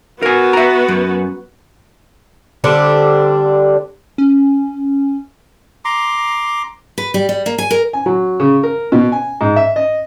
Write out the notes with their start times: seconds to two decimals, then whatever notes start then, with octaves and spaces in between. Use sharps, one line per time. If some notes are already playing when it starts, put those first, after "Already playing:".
0.22 B3 F#4 A#4 G#5
0.53 E5 A#5
0.88 F#2
2.64 D3 G3 C4 D4
4.18 C#4
5.85 A#5 C6 D6
6.98 B4
7.14 G3
7.29 G3
7.46 A#3
7.58 G#5
7.71 A#4
7.93 G#5
8.06 F#3
8.40 C#3
8.63 A#4
8.92 B2
9.12 G#5
9.41 G#2
9.56 E5
9.76 D#5